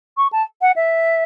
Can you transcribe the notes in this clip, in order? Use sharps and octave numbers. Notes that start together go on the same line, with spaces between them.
C#6
A5
F#5
E5